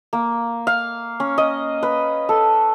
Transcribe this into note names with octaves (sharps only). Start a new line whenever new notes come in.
A#3
F5
C#4
D#5
B4
A4